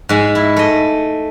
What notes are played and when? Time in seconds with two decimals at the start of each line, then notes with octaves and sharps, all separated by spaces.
0.09 G#2 G#3
0.35 E4
0.56 A3 D#5